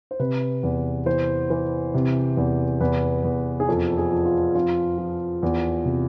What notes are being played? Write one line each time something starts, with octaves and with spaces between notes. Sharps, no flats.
C5
C3 B4
E2
E3 C5
E3
C3
E2
E2 B4
E2
G#4
F2 A4
G#4
F3
F4
F2 F4
F3
E2
C3